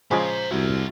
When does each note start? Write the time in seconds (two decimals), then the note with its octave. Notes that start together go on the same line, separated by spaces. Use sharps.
0.11 C#3 F3 G#3 C5 A#5
0.51 C2 F#4 E5